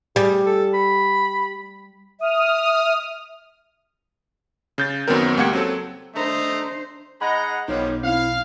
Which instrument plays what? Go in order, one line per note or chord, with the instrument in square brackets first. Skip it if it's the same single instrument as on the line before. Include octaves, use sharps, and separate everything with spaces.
[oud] G3 [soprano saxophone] G#4
[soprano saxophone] A4
B5
[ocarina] E5 [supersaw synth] D#6 F6
[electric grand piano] C#3 G6 A6
F#2 D#3 F#3 B3 C4 A#4
C#2 A#3 G4 F#5 G#6 C#7
F#3 C4 A4
[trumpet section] A3 D#5 A#5 [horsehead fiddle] D4 C5
[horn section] G#3 D#4 A#5 [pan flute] D#5 [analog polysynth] F#5 [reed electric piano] B5
[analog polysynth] B1 [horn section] D#3 F3 G3 [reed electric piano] D#4 [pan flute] C#5
[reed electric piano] C4 [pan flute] E4 [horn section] F5